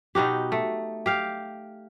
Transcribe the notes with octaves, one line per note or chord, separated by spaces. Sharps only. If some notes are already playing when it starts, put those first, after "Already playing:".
B2 D#4 F#4 G4
A3
G4 F5 G5